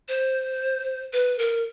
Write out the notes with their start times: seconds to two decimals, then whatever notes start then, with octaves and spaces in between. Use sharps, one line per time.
0.08 C5
1.13 B4
1.39 A#4